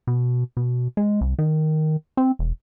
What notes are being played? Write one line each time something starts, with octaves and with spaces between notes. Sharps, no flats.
B2
B2
G#3
C2
D#3
C4
E1